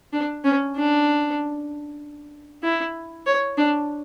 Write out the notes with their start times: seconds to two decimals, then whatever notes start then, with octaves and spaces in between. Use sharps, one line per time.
0.13 D4
0.44 C#4
0.76 D4
2.63 E4
3.27 C#5
3.57 D4